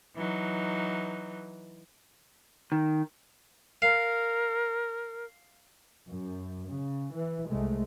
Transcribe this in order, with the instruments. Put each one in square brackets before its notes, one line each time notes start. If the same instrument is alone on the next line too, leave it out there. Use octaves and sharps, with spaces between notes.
[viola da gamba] E3 F#3 D#4
[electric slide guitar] D#3
[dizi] A#4 [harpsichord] F5
[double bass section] F#2
C#3
E3
C2 G#3 A3